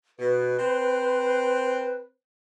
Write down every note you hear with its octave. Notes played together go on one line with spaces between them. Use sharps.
B2 B4
C4 C5